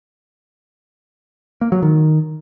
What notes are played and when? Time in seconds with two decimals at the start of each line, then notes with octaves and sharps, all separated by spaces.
1.61 A#3
1.72 F#3
1.82 D#3